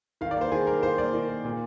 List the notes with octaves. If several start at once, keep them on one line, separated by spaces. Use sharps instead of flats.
D#3 F5
D5
A#3 C5
D#3 G#4
A#3 A#4
D#3 C5
A#3 D5
D#3
A#3
A#2